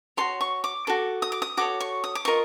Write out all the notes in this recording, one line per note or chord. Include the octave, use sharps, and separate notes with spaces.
F#4 A4 C#5 C6
C#6
D6
F#4 A4 D6
D#6
D6
D#6
F#4 A4 C#5 D6
C#6
D#6
D6
F4 A#4 D#5 C#6